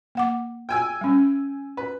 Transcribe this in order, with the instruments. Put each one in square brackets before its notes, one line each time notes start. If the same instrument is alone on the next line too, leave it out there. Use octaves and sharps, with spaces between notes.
[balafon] A#3 F#5 D6
[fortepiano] G5 G#5 E6
[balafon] G3 C#4
[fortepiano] B4